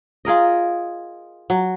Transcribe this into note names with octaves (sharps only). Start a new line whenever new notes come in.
F4 G#4 A#4 D#5
F#3